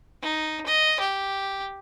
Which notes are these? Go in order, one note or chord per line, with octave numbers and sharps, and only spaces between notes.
D#4
D#5
G4